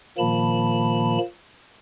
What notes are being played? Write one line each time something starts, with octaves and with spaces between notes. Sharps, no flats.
A#2 D#3 F3 A#3 A5 B5